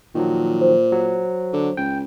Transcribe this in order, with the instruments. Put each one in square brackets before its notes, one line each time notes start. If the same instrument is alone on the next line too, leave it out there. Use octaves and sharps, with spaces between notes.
[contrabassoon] A#2 [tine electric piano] D#3 F3 F#3
[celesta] C5
[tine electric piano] F#3
[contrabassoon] D3
[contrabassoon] C#2 [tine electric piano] G5